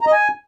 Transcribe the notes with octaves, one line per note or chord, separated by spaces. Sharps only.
A#5
D#5
G#5